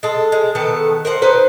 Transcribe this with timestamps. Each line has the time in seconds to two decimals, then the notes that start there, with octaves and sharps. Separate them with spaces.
0.03 G#3 A4
0.32 G#3
0.55 D#3 B3 A4
1.05 A#4 C5 F#5
1.22 D#4 B4 C5